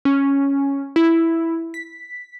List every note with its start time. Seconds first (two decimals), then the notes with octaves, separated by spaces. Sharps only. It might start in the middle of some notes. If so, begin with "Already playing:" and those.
0.05 C#4
0.96 E4
1.74 B6